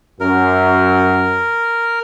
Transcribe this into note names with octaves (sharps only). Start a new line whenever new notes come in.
F#2 A#4